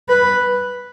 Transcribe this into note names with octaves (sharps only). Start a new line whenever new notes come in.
B4